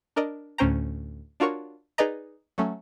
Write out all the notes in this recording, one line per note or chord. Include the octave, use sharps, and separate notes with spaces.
D4 A#4 D5 D#5
D2 A2 C#4 C5 G5 A#5
D4 F4 F#4 A#4 C#5
D#4 G#4 B4 D5 D#5 A#5
F#3 A3 C#4